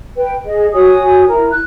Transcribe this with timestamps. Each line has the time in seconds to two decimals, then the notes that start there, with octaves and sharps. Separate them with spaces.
0.17 B4 G5
0.46 G#4 D#5
0.74 F#4 C#5 G#5 D#6
1.28 E4 A#4 A#5
1.51 F#6